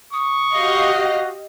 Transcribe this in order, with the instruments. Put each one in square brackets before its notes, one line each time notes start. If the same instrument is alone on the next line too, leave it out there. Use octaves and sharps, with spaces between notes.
[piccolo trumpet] C#6 [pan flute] D#6
[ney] F#4 [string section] G4 D#5 F5